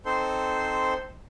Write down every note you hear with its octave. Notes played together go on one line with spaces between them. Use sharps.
C4 D#4 A4 C5 C6